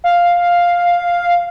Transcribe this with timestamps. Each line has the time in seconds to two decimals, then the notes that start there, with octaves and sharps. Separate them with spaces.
0.04 F5